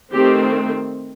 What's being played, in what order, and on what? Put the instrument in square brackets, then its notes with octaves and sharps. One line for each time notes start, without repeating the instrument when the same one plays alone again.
[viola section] D#3 A3 C4 G4